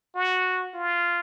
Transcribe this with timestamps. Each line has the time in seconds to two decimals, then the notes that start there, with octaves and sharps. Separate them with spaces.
0.16 F#4
0.74 F4